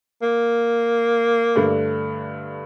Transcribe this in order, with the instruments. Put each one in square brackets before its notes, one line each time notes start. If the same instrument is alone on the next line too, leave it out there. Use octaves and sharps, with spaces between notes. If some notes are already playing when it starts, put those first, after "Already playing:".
[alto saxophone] A#3
[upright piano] G2 D3 A3